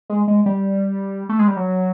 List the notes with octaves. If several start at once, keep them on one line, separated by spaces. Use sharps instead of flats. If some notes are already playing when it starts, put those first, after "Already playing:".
G#3
G#3
G3
A3
G#3
G3
F#3